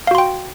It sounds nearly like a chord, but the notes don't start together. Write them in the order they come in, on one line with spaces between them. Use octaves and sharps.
F5 F#4 C6 G5